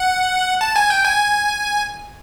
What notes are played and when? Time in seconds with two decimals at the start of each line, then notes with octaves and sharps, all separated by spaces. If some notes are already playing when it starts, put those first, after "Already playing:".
Already playing: F#5
0.61 A5
0.76 G#5
0.90 G5
1.05 G#5